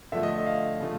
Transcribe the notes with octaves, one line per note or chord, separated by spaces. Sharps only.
D3 F3 A3 E5
D#5
F5
C#3 F3 A3